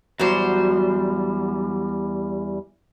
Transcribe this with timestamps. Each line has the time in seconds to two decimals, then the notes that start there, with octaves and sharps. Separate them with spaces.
0.20 E2 F#3 G3 C5